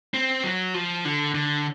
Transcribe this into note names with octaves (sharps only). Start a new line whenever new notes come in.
C4
F#3
F3
D3
D3